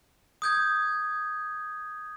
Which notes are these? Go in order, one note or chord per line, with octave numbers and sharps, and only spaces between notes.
D#6 G6 G#6